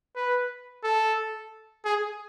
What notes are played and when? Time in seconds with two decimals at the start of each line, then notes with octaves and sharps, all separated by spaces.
0.16 B4
0.83 A4
1.85 G#4